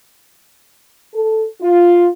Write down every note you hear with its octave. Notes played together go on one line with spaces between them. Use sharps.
A4
F4